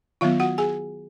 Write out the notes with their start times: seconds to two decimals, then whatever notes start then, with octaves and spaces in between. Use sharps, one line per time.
0.21 D#3 F#3 B3 F4 F5
0.40 F#4 F#5
0.58 G#4 G#5